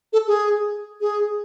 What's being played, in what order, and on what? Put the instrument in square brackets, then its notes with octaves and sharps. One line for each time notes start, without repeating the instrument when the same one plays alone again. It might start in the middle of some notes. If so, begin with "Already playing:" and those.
[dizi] A4
G#4
G#4